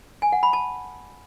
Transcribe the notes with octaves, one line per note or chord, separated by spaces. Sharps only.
G#5
F#5
B5
A5